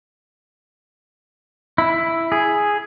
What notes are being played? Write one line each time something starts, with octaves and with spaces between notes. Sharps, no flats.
E4
G#4